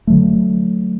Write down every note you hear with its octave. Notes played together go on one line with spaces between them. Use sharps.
D3 F#3 A3